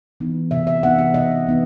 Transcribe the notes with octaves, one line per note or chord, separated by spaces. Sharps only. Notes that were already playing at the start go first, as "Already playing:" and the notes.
E3 B3 D#4
C3 E5
E5
E3 B3 D#4 F#5
E5
C3 D#5
E3 B3 D#4